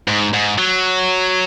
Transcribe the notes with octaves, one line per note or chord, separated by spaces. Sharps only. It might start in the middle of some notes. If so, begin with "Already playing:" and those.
G#2
G#2
F#3